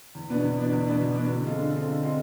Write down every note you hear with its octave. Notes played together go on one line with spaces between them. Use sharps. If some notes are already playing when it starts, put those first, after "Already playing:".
E2
B2 B3 D4
E2
B2 B3 D4
E2
B2 B3 D4
E2
B2 B3 D4
D3
G#3 C4 F4 A4
D3
G#3 C4 F4 A4
D3
G#3 C4 F4 A4